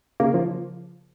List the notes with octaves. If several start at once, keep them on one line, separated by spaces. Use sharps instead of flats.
C#3 A#3
F3